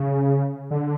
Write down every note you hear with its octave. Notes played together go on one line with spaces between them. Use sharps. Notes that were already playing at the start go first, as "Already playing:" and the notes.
Already playing: C#3
D3